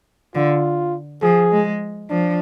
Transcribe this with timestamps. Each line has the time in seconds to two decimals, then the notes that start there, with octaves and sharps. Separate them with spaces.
0.35 D3 F4
1.22 F3 G#4
1.52 G#3
2.10 F3 D4